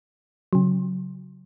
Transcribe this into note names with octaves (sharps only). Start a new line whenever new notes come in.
C#3 F#3